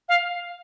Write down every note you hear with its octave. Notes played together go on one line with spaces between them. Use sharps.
F5